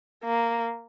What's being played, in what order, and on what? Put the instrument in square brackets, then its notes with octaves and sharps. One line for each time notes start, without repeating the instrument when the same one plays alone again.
[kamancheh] A#3